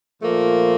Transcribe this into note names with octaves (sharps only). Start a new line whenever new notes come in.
A#2 F3 A3 A#3